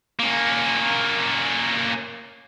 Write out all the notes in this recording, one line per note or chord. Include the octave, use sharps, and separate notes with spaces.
A#3 C#4